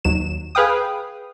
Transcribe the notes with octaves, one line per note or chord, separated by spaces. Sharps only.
D#2 F#3 E7
G#4 B4 F5 G5 D#6